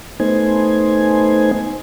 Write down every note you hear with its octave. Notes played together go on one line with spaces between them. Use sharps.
A3 B3 D#4 C5 G#5